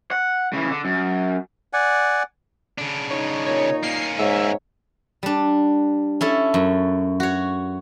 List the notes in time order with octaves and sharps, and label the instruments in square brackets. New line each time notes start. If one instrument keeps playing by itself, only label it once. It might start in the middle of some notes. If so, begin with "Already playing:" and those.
[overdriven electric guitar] F#5
C#3 E3
D3
F#2
[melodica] D5 F#5 G#5
[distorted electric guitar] C#3 D4
[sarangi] D#4 [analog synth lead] C#5
[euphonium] A#2 [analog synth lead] C#5
[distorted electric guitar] A#3 C#4 [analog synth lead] C7
[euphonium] G#2 [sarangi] C#5 [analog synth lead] E5
[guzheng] G3 D4
C#4 E4 A4
F#2
F#4 C#5